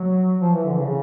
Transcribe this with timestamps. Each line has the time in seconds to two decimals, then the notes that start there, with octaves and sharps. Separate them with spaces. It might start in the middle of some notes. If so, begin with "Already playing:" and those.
Already playing: F#3
0.41 F3
0.53 E3
0.66 D3
0.78 C#3